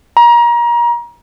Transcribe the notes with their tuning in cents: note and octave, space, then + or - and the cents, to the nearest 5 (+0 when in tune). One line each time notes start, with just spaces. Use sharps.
A#5 +30